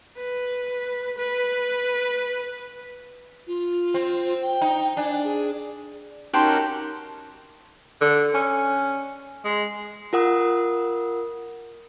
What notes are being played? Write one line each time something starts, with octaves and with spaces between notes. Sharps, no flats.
B4
B4
F4
C4
G5
D#4
D4 G#5
G#4
C#4 D#4 F#4 G4 A#4 G5 A5 C6
D3
C#4
G#3
F4 A#4 F#5 D#6